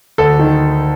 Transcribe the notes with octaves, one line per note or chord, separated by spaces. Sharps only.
D2 A4
D#3